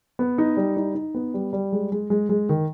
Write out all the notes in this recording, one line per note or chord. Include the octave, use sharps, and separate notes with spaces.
B3
D#4
G3
D#4
D#4
B3
G3
G3
G#3
G#3
G#3
G#3
D#3